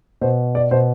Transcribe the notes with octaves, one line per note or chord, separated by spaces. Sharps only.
B2 C5
D5
B2 C5